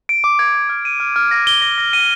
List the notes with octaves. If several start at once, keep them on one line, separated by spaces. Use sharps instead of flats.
D7
D6
G#6
G#6
F6
D#7
F6
F6
A#6
G7
A#6
A#6
D#7